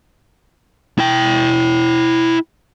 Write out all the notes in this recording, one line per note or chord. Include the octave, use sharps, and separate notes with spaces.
E4 G5